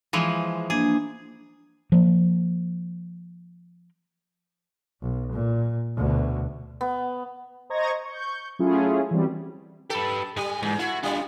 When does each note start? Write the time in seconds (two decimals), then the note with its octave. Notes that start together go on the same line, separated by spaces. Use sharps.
0.13 E3 F3 G#3
0.70 A#3 D4 G#4
1.92 F3 A#3
5.02 B1
5.32 A#2
5.96 D2 B2
6.81 B3
7.70 C5 D#5 A#5 C#6 G#6 A#6
8.05 C#6 G6
8.59 F#3 A3 C#4 E4 F4 G#4
9.11 E3 F#3 G3 C4
9.90 G4 A4 B4
10.37 G#2 G3 G#5
10.63 E2 G#2
10.79 E4 F#4
11.03 G3 D4 F4